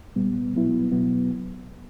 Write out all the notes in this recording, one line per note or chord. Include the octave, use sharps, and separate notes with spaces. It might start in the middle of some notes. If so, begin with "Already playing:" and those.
C2 A#2 G3 B3
B2 F#3 B3 E4
B2 F#3 B3